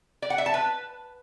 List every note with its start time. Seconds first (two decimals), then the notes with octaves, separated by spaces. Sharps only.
0.22 D5
0.30 F#5
0.38 E5
0.46 A5
0.54 B4